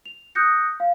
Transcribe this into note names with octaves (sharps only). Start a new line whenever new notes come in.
F7
D#6 F#6 G6 A#6 C#7
F5